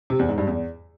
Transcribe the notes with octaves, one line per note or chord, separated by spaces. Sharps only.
C3
E2
G#2
G2
E2